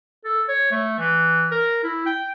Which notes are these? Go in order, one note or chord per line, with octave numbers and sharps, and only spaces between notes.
A4
C#5
A3
E3
A#4
E4
G5